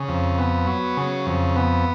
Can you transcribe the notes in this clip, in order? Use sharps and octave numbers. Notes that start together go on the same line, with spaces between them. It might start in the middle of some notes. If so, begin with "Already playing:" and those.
Already playing: C#3
F2
B3
F#3
C#3
F2
B3